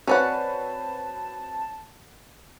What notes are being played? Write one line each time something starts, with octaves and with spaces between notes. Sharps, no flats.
C4 C#4 F#4 B4 D5 F#5 A5